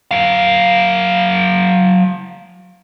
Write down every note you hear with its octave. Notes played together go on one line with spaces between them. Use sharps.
F#3 F5